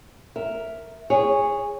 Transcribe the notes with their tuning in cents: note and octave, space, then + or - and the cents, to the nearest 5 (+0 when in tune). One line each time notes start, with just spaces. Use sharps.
A#4 +0 E5 +0
G#4 -20 C#5 +0